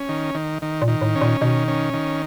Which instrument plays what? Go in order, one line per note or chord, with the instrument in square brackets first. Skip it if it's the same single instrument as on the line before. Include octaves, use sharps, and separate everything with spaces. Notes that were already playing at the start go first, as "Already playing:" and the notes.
Already playing: [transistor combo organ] C#4
D#3
D#3
D#3
[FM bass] A#2
[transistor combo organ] D#3
[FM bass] A2
[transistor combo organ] C#4
[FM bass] A#2
[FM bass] B2 [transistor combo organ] D#3
[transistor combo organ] C#4
D#3